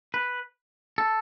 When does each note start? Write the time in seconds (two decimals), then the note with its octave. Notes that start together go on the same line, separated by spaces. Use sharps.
0.14 B4
0.98 A4